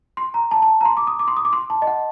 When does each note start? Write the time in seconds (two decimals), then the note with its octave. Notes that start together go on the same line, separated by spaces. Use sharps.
0.17 C6
0.34 A#5
0.51 A5
0.62 A5
0.81 A#5
0.85 C6
0.97 D6
1.07 D#6
1.19 D6
1.28 C6
1.37 D#6
1.45 D6
1.53 C6
1.70 A5
1.82 D#5
1.87 F#5